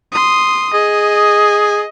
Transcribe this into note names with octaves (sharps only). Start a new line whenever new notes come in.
C6 D#6
G#4 D#5